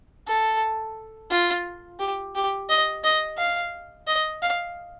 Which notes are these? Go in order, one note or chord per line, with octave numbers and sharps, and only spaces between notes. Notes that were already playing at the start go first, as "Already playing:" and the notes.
A4
F4
G4
G4
D#5
D#5
F5
D#5
F5